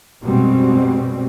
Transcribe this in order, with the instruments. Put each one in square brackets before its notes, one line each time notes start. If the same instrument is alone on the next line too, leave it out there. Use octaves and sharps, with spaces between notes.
[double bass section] F#2 B2 G3 G#3 C4